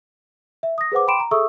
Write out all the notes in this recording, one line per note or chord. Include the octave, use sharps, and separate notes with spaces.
E5
D#6 A#6
G#4 B4 C5 F#5 D6
G5 B5 C6 D6 D7 E7
A#5
G#4 A4 E5 C#6 D#6 E6